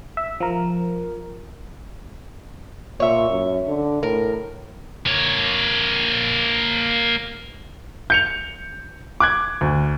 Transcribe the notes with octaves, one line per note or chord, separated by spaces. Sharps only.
E5
F3 A#4
A#2 C#5 E5
F#2
D3
A2 A#4
A#3 C#5
G6 C#7 F7
D6 F#6 G#6
D2